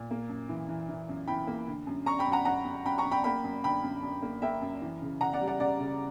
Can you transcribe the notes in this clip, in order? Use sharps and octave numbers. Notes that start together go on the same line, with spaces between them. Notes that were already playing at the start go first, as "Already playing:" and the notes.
Already playing: A#2
A#3
F#2
E3
E3
E3
F#2
E3 G5 B5
A#3
D3
F#2
F#2 A#5 C#6
G5 B5
F#2
F#5 A#5
F#2 F#5 A#5
F#2
F#2 G5 B5
A#5 C#6
F#2
G5 B5
A#3 G5 B5
F#2
D3 G5 B5
F#2
F#2
A#3
A#3 E5 G5
F#2
E3
C#3
C#3 F#5 A#5
D5 F#5
G3
D5 F#5
C#3 D5 F#5
C#3